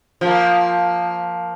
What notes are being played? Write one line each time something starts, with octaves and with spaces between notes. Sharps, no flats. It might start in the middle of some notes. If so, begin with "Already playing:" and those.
F3 A#3